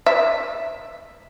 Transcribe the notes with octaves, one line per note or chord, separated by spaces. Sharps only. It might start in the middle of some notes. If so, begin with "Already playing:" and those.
E5